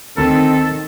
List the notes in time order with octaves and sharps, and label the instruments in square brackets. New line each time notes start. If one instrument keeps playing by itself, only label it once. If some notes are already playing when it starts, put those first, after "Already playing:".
[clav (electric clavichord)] D2 A#4 [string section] D#3 [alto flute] C4 [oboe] A4